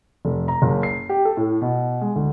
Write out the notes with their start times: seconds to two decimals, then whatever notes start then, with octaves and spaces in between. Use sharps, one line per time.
0.25 F1
0.48 A#5
0.62 F#1
0.83 C7
1.09 G4
1.25 A4
1.37 A2
1.61 B2
2.01 G#3
2.16 D2